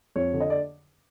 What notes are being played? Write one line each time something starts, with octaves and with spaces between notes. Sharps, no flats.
F2 C#5
D3
D#5
D5